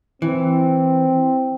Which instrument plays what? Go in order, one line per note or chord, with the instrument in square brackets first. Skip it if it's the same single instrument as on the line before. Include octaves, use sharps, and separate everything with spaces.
[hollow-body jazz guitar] E3 [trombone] C4